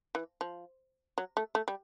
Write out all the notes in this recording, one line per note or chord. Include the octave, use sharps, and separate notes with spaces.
E3
F3
F#3
A3
A3
G3